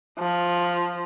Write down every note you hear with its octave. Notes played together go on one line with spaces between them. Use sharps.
F3